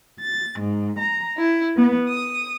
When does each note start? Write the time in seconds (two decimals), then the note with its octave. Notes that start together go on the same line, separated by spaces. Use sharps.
0.20 A6
0.59 G#2
0.99 A#5
1.37 E4
1.76 B3
2.08 D#6